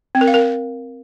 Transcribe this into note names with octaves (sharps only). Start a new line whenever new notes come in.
C4
A#4
F5
A#4